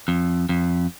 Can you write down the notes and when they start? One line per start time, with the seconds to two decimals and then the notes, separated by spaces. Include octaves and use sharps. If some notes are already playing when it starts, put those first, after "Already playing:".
0.08 F2
0.49 F2